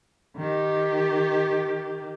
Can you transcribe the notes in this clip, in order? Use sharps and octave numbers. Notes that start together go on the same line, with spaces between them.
D#3 G4